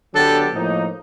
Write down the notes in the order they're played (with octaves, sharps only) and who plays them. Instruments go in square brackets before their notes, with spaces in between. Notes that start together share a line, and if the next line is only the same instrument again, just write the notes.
[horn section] D3 F#3 B3 D4 G4 [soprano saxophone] A4
[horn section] A2 F3 A#3 D#4